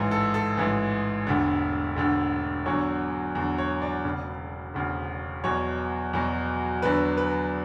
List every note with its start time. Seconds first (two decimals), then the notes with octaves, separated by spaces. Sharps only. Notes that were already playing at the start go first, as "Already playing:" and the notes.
Already playing: A1 G#2 E3
0.11 A4
0.34 A4
0.57 A1 G#2 E3
1.27 E1 D2 D3
1.96 E1 D2 D3
2.66 E2 D3 F#3 C#5
3.35 E2 D3 F#3
3.58 C#5
3.82 D5
4.05 E1 D2 C#3
4.74 E1 D2 C#3
5.44 E2 B2 F#3 C#5
6.13 E2 B2 F#3
6.82 E2 D3 F#3 B4
7.17 B4